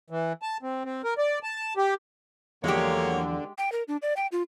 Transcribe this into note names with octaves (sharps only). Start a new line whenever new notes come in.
E3
A5
C4
C4
A#4
D5
A5
G4
E2 D3 F3 F#3 G#3 A#3 G4 C#5
G5
A#4
D4
D5
G5
F4